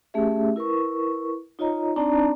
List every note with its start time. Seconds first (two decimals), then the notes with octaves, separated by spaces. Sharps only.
0.14 A3 C#4 G4 G#4 E5
0.56 E4 A#4 B4 C#6
1.59 D#4 F4 C#5 D#5 A#5
1.96 C4 D4 D#4 D5 A5 A#5